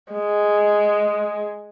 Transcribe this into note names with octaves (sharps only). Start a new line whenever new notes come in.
G#3